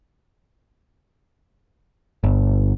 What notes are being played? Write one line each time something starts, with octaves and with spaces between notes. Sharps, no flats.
G1